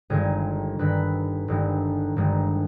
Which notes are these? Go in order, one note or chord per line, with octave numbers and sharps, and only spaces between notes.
G1 G2 D#3 G#3 G#4
G1 G2 D#3 G#3 B4
G1 G2 D#3 G#3
G1 G2 D#3 G#3